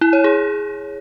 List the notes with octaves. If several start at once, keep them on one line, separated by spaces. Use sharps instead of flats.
E4
C#5
G#4